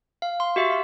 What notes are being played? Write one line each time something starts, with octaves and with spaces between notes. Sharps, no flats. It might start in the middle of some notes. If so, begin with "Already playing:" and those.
F5
C6
F#4 G4 E5
F5